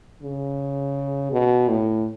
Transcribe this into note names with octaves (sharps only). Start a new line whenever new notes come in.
C#3
B2
A2